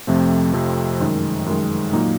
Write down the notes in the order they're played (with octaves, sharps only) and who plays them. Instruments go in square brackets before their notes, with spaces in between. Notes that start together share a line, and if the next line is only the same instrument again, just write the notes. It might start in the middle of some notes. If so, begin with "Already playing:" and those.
[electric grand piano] F2 C3 F3 A3 C4
F2 C3 F3 A3 C4
F#2 D#3 G#3
F#2 D#3 G#3
A#2 F#3 A#3 D#4